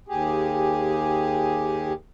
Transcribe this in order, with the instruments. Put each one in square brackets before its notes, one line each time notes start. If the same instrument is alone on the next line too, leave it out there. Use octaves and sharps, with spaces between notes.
[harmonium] D#2 G4 G#4